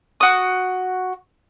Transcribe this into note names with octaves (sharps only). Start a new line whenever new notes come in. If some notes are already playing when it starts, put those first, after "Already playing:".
F#4 D#6